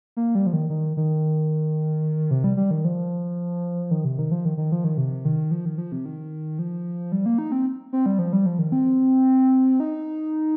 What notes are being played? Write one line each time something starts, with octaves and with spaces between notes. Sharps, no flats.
A#3
G3
F3
D#3
D#3
D#3
C3
G3
G3
D#3
F3
D#3
C3
D#3
F3
D#3
D#3
F3
D#3
C3
D#3
F3
D#3
F3
C3
D#3
F3
G3
A#3
D#4
C4
C4
G3
F3
G3
F3
D#3
C4
D#4